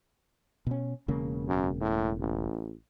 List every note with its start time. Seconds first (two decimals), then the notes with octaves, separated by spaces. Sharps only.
0.67 B2 C#4
1.08 E1 C#3 A#3
1.48 F#2
1.81 A2
2.20 A1